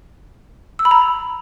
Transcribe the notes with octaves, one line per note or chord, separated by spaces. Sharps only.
E6
B5
A#5